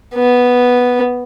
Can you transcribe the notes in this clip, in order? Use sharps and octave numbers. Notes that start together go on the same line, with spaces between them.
B3